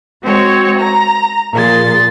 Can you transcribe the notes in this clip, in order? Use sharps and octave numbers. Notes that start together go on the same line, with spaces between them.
G#3 C4 F#4 C#5
A#5
A#2 F3 G#4 C6 A6